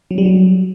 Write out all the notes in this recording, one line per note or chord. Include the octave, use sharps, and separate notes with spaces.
F#3
G3
F#3